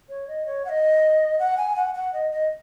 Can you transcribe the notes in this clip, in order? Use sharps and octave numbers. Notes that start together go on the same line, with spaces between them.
C#5
D#5
C#5
F#5
D#5
F#5
G#5
F#5
F#5
D#5
D#5